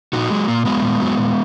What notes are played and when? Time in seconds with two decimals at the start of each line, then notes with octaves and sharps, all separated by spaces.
0.13 A#2 D#4 F#4
0.30 F#3 G#3
0.48 A#2 A#3
0.65 F#3 G#3 B3
0.82 A#2
1.00 F#3
1.17 A#2